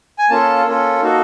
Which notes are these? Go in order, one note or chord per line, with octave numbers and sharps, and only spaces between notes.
G#5
A#3 C#4 F4 A4 A5
A#3 C#4 F4 A4
A#3 D#4 F#4 A4